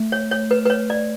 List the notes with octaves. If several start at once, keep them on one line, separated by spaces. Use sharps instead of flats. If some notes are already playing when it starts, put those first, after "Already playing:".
Already playing: A3
C#5
C#5
B4
B4
C#5
D5